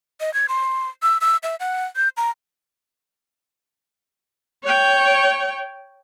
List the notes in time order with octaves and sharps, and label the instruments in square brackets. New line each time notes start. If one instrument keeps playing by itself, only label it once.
[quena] D#5
G#6
C6
E6
E6
E5
F#5
G6
A#5
[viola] C#5 G5